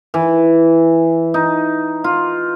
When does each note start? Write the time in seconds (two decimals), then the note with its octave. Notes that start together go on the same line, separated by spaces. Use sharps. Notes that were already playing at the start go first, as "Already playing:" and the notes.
0.14 E3
1.34 D#4
2.04 F4